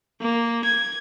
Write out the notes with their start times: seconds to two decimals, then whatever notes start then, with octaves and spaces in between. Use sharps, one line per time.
0.21 A#3
0.65 G#6